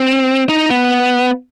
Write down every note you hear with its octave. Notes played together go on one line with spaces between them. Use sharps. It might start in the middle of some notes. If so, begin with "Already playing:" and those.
Already playing: C4
D#4
B3